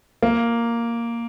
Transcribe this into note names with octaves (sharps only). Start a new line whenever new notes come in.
A#3